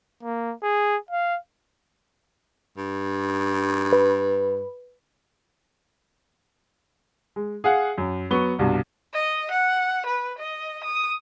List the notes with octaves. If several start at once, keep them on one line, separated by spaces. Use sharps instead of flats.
A#3
G#4
F5
G2
B4
G#3
G#4 F5 F#5
F#2
F#3 B3 C#6 G7
C2 G2 B2
D#5
F#5
B4
D#5
D#6